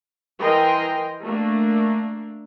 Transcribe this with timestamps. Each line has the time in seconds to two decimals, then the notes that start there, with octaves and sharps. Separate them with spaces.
0.40 E3 A#4 D#5 G5 C6
1.23 A3 A#3 D4